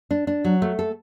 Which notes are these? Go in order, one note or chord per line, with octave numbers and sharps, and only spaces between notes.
D4
D4
F#3
A3
A4